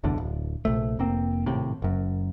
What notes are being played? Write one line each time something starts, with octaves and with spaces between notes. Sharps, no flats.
F#1 B1 E2 D3
D1
A#1 C3 A3
F1 A#3 C4
G#1 A2 C3
F#1 F#2